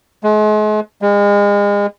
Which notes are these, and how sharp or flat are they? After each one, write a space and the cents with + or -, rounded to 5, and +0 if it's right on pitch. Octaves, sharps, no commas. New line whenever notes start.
G#3 +40
G#3 -35